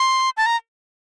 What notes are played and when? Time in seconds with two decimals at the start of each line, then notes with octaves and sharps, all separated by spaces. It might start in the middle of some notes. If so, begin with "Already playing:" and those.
Already playing: C6
0.37 A5
0.46 A#5